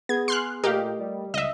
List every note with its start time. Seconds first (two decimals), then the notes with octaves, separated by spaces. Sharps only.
0.09 B3 G#4 G#6
0.28 C6 F6 F#6
0.64 A#2 A3 G4 A#4 D#5 F5
0.99 G3
1.34 C#2 D#5 E5